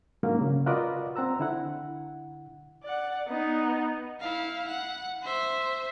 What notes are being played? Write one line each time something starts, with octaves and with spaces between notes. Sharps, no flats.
G#2 D3 F#3 G#3 A#3 C#4
C#3
F4 F#4 A#4 B4 D5 D#5
C4 F#5 A#5 E6
D3 E4 F#5
D5 F#5
B3 D#4
E4 F5
F#5
C5 E5